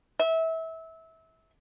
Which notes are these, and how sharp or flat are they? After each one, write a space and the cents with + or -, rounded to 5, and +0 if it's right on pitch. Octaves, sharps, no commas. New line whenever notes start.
E5 -25